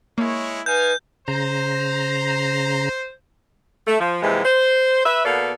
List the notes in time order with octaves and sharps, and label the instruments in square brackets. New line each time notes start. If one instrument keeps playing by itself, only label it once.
[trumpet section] G#3 E4 C#5 [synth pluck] A#3
[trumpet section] D#4 F5 G#5 [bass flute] B4 [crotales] G6
[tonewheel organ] C#3 A#5 [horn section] C5
[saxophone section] A3
F3
D#2 C3 E3 F3 G#3
C5
B4 E5
B2 A#3 B3 A4 D5 F5